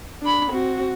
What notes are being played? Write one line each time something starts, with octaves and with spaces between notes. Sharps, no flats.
D4 B5
C4 F#4